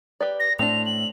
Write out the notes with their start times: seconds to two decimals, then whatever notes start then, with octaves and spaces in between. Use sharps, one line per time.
0.20 G4 B4 D5
0.40 A#6
0.59 A2 A3 C4 D4 F7
0.86 F#7